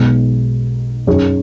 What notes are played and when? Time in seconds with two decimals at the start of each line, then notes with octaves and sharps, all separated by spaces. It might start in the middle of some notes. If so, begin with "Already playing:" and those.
Already playing: B1 B2 G#3 B3 D#4
1.07 F#2 F#3 D#4 G#4 C#5